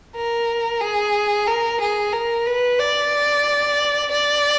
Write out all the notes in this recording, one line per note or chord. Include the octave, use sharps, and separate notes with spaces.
A#4
G#4
A#4
G#4
A#4
B4
D5
D5